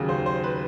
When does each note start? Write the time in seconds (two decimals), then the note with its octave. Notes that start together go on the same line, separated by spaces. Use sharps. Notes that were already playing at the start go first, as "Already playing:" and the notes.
Already playing: D#2 C#3 F#3
0.09 C5
0.26 C5
0.43 B4